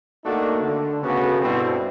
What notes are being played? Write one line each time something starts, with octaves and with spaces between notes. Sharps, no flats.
A3 A#3 D4 D#4 F#4
D3
D2 C#3 A3 B3 F#4
G2 B2 D3 C4 E4